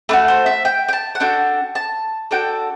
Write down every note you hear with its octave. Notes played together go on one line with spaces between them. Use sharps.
A3 D4 F#4 B4
C5
E5
G5
G5
A5
F#5
D4 F#4 A4 G5
A5
D4 F#4 A4 G5